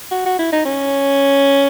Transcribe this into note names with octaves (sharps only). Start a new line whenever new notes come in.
F#4
F#4
E4
D#4
C#4